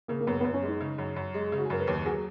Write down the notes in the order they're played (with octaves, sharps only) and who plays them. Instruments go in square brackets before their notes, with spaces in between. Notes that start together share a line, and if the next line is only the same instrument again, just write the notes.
[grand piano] C#3 [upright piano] A#3
[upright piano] A#3
[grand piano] F#2 [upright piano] B3
[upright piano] B3
[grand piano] F#2
[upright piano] C#4
[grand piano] G#3
[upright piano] D#4
[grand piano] C#3
F#2
F#2
G#3
C#3
[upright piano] F#4
G#4
[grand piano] F#2 [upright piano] A#4
[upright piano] B4
[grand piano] D#2 [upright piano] C#5
[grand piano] F#3 [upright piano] G#4